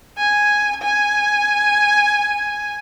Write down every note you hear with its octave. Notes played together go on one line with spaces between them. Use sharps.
G#5
G#5